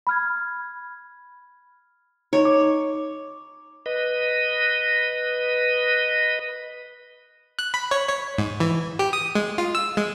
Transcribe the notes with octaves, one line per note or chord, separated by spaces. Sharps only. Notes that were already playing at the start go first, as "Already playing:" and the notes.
B5 F6 G#6
D#4 C#5
D6
B4 D#5
F#6
B5
C#5
C#5
G#2
E3
G4
D#6
G#3
F4
E6
G#3